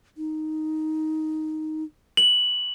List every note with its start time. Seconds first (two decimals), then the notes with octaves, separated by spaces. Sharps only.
0.17 D#4
2.17 F#7